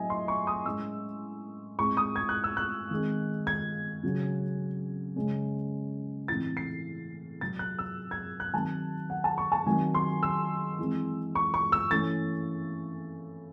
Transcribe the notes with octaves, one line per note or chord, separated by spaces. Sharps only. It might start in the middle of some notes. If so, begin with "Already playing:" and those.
Already playing: A2 F#3 A3 C4 D#5 E5 G#5
C6
C#6
D#6
A2 G#3 C#4 E6
A2 G#3 C4 C#6
D#6
G#6
F#6
E6
F#6
D#3 G#3 C4
G#6
C#3 F#3 C#4
C#3 G#3 C#4
A2 E3 C4 A6
C7
C3 F#3 C4 A6
F#6
E6
G#6
F#6
D#3 F#3 C4 A5
F#5
A5
C#6
A5
D#3 F#3 C4 G#5
C6
E6
E3 G#3 C4
C#6
C#6
E6
E3 A3 C#4 A6